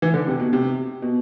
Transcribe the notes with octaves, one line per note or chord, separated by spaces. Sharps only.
E3
D3
C3
B2
C3
B2